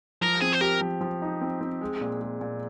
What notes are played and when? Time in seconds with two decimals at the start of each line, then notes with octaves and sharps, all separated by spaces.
0.21 F3 A#4
0.41 C4 G#4
0.52 C5
0.61 G4 A#4
0.81 F3
1.01 F3
1.22 D#4
1.41 C4
1.61 C4
1.81 G#3
2.01 A#2
2.21 G#3
2.41 A#2